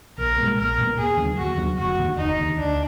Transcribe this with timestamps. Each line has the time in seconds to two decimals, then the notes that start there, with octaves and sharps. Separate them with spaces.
0.18 A#1 A#4
0.38 A#2 G#3 B3
0.58 A#1 A#4
0.78 A#2 G#3 B3
0.97 D#2 G#4
1.17 D3 F#3 B3
1.37 D#2 F#4
1.57 D3 F#3 B3
1.77 F1 F#4
1.97 D#2 D3
2.17 F1 D#4
2.37 D#2 D3
2.56 D2 D4